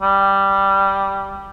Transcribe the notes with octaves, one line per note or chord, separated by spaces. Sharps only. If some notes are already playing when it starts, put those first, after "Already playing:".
G3